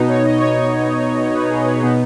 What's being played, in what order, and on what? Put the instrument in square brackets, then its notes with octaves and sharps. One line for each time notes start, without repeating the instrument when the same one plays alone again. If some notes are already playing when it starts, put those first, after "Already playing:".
Already playing: [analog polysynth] B2 B3 D#4
C#5
D#5
C#5
B4
G#4
B4
B2 B3 D#4 G#4